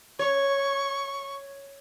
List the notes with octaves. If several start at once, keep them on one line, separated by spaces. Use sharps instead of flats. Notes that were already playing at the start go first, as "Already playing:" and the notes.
C#5 C#6